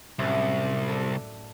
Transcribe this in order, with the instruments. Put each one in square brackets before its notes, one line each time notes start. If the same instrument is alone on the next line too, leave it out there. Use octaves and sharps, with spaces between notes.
[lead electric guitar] C2 [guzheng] F#2 A2 E4
[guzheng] D4 A4